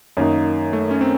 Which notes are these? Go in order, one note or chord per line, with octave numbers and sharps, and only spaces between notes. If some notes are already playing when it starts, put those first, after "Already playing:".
F#2 D#3 A#3 D#4
A3
C#4
C4